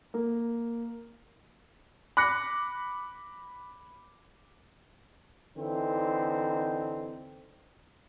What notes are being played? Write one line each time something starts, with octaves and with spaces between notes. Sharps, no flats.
A#3
B5 D6 F#6 A#6 C#7
D3 E3 C4 D#4